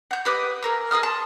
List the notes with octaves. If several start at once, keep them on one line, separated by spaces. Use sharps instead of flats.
F#5 G6
G4 B4 D#5 D6
G#4 A#4 E6
G#4 D#5 D#6 F6
A5 C6